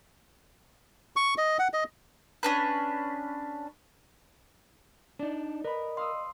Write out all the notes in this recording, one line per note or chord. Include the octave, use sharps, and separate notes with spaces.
C#6
D#5
F#5
D#5
C#4 D4 B4
D4 D#4 D5
A#4 B4 D#5 B5
F5 C6 D#6 E6